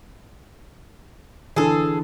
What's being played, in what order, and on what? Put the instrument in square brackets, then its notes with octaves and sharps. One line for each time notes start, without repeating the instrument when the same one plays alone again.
[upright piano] D3 E3 [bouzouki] G#4 A4